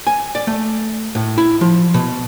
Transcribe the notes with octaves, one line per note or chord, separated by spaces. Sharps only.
G#5
D5
A3
A2
E4
F3
B2